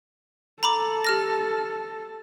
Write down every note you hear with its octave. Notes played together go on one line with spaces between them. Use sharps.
A4 A#5 B5 D6
G4 F6 A#6